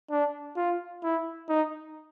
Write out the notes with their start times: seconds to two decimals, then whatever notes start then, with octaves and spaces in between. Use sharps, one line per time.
0.11 D4
0.57 F4
1.03 E4
1.49 D#4